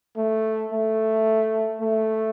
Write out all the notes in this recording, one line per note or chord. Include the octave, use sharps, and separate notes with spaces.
A3
A3
A3